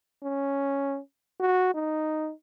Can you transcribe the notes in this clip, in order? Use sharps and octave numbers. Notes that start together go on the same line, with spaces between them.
C#4
F#4
D#4